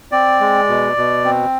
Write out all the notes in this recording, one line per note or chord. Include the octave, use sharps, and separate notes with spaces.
C4 D5
G#3
B2
B2
C4